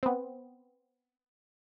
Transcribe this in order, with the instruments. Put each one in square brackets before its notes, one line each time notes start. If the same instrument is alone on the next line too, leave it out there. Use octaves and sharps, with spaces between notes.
[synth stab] B3 C4